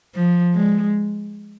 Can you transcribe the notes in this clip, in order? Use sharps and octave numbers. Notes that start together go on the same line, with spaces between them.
F3
G#3